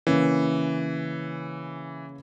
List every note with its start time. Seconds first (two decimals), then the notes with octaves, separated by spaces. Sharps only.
0.07 C#3 E3 A#3 C#4